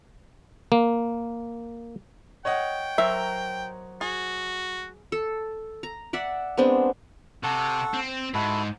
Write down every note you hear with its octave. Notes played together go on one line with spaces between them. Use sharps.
A#3
C#5 D#5 F#5 G5
F#3 A#4 C5 E5
F#4 G#4
A4
A#5
D5 E5 F#5
G#3 B3 C4 D4
C3 A4 F#5 C#6
C4
G#2 E4 F#4 A4